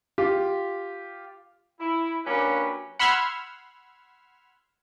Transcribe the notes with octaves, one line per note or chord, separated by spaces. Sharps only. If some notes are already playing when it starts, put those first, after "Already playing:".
F4 G4
E4
F#3 A#3 C#4 D4 G4 B4
F#5 B5 C6 E6 F6 G#6